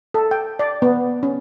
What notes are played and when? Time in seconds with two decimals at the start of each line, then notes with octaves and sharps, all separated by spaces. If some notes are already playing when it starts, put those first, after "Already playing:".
0.14 A4
0.31 G5
0.59 D5
0.82 B3
1.23 C#4